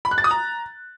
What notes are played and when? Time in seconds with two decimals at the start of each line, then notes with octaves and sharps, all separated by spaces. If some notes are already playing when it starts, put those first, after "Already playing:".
0.05 B5
0.11 F#6
0.18 A6
0.24 D#6
0.31 A#5